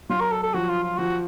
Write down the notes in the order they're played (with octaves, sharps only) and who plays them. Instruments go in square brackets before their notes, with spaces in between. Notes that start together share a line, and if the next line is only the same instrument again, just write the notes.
[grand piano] F#3 [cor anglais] F4
[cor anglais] A#4
A4
A4
[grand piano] F3 [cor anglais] F#4
[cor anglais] F4
F4
[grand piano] F3 [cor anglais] F#4